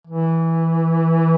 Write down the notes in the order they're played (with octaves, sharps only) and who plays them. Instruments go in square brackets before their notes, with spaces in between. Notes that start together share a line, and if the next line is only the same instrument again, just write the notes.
[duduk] E3